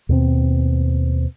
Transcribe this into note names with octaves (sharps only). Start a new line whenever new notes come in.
D#2 B2 C4